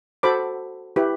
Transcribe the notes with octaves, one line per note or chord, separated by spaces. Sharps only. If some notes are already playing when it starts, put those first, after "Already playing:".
F#4 A4 C5 B5 D6
E4 G4 B4